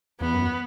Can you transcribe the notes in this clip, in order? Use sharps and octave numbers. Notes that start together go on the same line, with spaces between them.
E2 B3
F#2